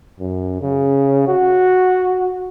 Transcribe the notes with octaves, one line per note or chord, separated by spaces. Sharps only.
F#2
C#3
F#4